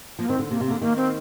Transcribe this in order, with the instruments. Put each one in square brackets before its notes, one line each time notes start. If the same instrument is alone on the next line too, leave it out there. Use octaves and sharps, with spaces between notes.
[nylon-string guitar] F3 [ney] A#3
[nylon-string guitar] D#3 [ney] C4
[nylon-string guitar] D3
[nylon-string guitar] C3 [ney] A#3
[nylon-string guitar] C3
[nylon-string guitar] D3 [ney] A#3
[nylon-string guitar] D#3 [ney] A#3
[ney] C4